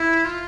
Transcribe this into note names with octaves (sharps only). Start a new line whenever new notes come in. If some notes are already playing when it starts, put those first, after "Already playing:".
Already playing: E4
F4